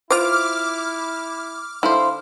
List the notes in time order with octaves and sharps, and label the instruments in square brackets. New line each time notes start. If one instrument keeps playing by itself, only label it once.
[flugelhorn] E4 [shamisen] F4 C5 [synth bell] D6 F6
[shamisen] D3 [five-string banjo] E4 C5 [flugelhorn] F5